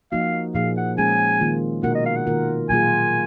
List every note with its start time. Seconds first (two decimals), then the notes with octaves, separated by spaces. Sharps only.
0.12 F3 A#3 D#4 F#4 F5
0.55 A#2 F3 A#3 D#4 G#4 F5
0.77 F#5
0.98 G#3 C#4 G#4 G#5
1.41 D#3 A#3 F4
1.83 B2 A#3 D#4 F#4 A#4 F#5
1.95 D#5
2.06 F5
2.16 F#5
2.27 D#3 A#3 F4 A#4
2.69 A#2 F#3 A#3 F4 G#4 G#5